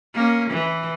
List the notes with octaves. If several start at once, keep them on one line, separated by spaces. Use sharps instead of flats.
A#3 C#4
E3